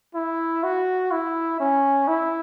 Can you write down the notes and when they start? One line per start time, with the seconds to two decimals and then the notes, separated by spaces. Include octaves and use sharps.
0.15 E4
0.63 F#4
1.12 E4
1.60 C#4
2.08 E4